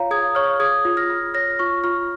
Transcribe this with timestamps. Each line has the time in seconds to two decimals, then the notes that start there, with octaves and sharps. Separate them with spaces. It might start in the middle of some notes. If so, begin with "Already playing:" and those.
Already playing: F4 C#5 F5 A#5
0.11 G#4 D#6 G#6
0.35 C#5 C#6 F6
0.60 G#4 D#6 G#6
0.85 F4
0.97 F6 A#6
1.10 F4
1.34 C#5 F6 A#6
1.59 F4 C#6 F6
1.84 F4 C#6 F6